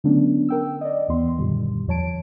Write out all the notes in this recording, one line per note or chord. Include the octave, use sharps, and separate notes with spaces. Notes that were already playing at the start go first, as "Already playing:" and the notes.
D3 F#3 A3 B3 C#4 D4
A#4 G5 E6
D5 D#5
D#2 E3 B3 C6
F#2 A#2 D3 D#3 G3
E2 F3 C#5 A5 D7